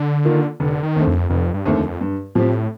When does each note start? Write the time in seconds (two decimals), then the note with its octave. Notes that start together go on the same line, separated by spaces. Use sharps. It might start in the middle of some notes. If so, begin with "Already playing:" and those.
Already playing: D3
0.25 D#3 A#3 F4
0.60 F1 D3
0.83 D#3
0.96 D#2 D3 A3 C4
1.08 F2
1.30 F1 F2
1.54 G2
1.66 D#2 D3 A3 C4
1.77 F2
2.01 G2
2.35 A2 F3 C4 G4